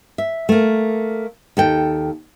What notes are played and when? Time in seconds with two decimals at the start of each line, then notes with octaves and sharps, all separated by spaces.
0.18 E5
0.49 A3 A#3
1.57 D#2 A4 G5